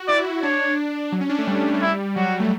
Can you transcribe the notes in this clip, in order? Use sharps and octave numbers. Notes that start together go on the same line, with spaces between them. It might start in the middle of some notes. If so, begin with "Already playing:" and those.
Already playing: F#4
E4 D5
D4 C#5
F#3
C#4
D4
A3
G3
E4
F#3 F#4
G3
A3